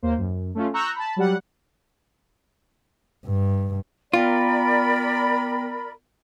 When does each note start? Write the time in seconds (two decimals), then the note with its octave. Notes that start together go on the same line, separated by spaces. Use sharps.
0.03 D#2 A#3 C5
0.18 F#2
0.55 A3 C#4 F4
0.74 A#5 C#6 E6 F#6 G6
0.95 A5 B5
1.16 F#3 G3 F#5
3.26 G2
4.14 B3 F4 A#4 D5 G5 B5